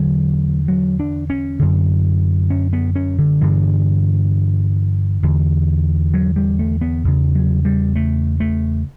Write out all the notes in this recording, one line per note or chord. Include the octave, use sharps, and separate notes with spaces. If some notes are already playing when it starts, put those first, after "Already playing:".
Already playing: E2 D3 F#3
F#3
D4
C#4
F#2 D3
C#4
B3
C#4
D3
G2 D3 E3
E2 D3
F#3
G3
A3
B3
E2 C#3
F#3
G3
A3
A3